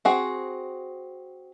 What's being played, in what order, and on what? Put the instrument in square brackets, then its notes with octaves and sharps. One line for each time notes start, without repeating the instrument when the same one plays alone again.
[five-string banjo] C4 F#4 G#4